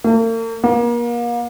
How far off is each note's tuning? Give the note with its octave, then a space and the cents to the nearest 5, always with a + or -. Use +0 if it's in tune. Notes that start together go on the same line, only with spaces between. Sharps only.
A#3 -45
A#3 +35